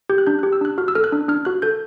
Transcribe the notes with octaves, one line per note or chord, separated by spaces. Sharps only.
G4 G6
F#6
D4 G6
G4 F#6
E6
D4 F#6
F#4 F6
E6
A4 F6
F#6
D4
D4 F6
F#4 F#6
A4 G6